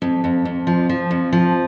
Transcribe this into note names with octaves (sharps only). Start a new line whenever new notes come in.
F2
F2
F2
F3
F3
F2
F3